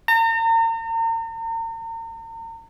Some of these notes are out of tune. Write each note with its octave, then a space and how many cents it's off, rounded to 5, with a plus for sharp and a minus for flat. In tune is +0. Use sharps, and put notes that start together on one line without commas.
A#5 -40